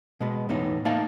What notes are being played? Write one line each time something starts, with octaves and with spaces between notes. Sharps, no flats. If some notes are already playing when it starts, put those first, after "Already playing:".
B2 G#3 B3
E2 A2 B3 D#4
A3 A#3 D#4 F5 A5